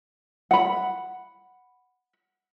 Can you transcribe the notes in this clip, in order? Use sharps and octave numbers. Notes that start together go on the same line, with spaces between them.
F#5 B5